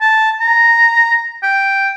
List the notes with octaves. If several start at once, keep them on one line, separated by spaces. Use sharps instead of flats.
A5
A#5
G5